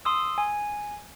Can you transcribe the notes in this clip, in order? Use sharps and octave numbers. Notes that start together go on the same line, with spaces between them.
C6 D#6 E6
G#5